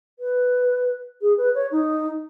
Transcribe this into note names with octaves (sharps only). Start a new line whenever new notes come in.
B4
G#4
B4
C#5
D#4